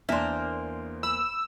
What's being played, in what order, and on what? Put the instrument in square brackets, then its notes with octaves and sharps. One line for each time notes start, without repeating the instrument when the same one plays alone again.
[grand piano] E2 C6 [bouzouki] A#3 C5 [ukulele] D4 E5
[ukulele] B5 [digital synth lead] E6